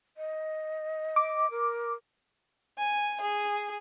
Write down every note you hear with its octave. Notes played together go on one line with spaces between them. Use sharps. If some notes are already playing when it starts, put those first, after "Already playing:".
D#5
D6
A#4
G#5
G#4